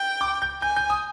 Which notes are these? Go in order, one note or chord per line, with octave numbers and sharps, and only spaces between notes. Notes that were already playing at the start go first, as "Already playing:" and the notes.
Already playing: G5
D6
G6
G#5 G6
G6
D#6